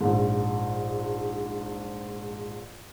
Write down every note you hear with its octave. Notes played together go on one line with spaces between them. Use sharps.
A#1 G#2